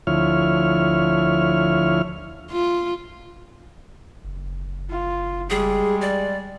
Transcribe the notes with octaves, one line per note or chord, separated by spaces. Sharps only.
D2 F3 E4 C#5 F6
F4
F#1
F4
G3 G#3 G#4
D5